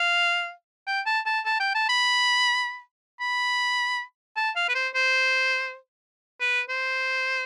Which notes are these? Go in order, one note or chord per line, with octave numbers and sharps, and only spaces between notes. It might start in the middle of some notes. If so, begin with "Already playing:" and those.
Already playing: F5
G5
A5
A5
A5
G5
A5
B5
B5
A5
F5
B4
C5
C5
B4
C5